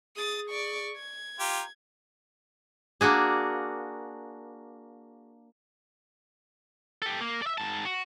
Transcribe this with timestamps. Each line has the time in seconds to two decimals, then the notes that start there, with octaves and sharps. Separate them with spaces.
0.16 G#4 D#6 A6
0.50 D5 C#6
0.97 G#6
1.40 F4 G4 A#5
3.01 A#3 D4 F#4 G#4
7.02 G4 A4
7.21 A#3
7.42 D5 E5
7.58 G#2 A5
7.85 F#4